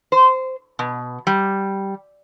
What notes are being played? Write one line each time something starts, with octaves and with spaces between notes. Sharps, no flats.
C5
B2
G3